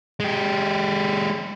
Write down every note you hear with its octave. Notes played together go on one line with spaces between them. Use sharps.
G#3 G4